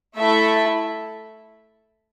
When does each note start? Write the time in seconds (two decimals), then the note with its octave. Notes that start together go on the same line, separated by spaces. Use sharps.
0.17 A3 E4 A4 E5